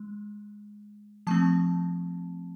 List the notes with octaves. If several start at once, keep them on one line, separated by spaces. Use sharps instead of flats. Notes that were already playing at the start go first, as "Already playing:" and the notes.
Already playing: G#3
F3 A3 C4 A5